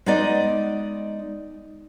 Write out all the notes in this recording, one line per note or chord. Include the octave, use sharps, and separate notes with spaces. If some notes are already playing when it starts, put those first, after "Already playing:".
G#3 B3 D#4 D5 D#5